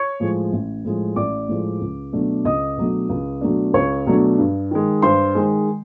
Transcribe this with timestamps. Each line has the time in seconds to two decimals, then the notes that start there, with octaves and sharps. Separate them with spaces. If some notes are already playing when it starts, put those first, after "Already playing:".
Already playing: C#5 C#6
0.20 A2 F3 G#3
0.52 A1
0.85 A2 F3 G#3
1.16 A1 D5 D6
1.48 A2 F3 G#3
1.81 C#2
2.13 B2 F#3 A3 D4
2.45 C#2 D#5 D#6
2.77 B2 F#3 A3 D4
3.09 C#2
3.41 B2 F#3 A3 D4
3.74 C#2 C#5 C#6
4.06 B2 F#3 A3 D4
4.38 G2
4.71 D#3 G#3
5.02 G2 C5 C6
5.35 D#3 G#3